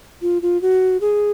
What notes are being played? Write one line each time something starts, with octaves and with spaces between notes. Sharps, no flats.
F4
F4
F#4
G#4